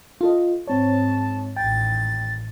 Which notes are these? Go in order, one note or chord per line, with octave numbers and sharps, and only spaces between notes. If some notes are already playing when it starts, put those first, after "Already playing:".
F4 A4 D#5
G#2 C4 C#5 A5
A1 D#2 G5 A6